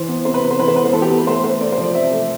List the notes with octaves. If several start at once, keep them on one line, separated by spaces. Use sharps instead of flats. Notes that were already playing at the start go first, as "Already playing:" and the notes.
Already playing: E3 C5
B3
C3 C5
B4
C3
C5
E3 B4
C5
B3 B4
C5
E3 A4
G4
B3 A4
B4
A3 C5
A3 C5
A3 D5
C5
F3
D5
C3 E5
A3